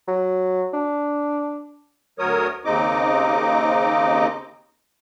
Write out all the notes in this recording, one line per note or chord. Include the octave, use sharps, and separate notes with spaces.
F#3
D4
D2 F#3 A#4 C#5 D#6
D#2 C#3 C4 D#4 D#5 D6